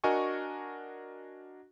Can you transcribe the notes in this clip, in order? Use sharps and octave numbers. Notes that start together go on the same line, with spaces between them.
D4 F#4 A#4 D#5 G#5 C#6